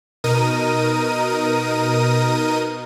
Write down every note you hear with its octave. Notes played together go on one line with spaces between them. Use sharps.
B2 D#4 A#4 D#6 D#7